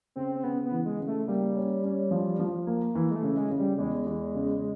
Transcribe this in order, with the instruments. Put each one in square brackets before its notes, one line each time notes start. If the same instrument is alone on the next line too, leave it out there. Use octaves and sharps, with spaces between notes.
[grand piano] C#3 [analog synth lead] C4
[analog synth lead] C4
[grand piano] C#3 [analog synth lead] B3
[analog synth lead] B3
[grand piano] E3
[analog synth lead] G#3
[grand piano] C#3
[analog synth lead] A3
[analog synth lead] G3 [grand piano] A#3
[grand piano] C#4
C#4
F3
F3
A#3
E3
[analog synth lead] G#3
A3
[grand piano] C#3
[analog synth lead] G#3
[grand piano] C#3
[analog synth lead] G3
[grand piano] E2 [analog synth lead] G#3
[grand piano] E2
C#3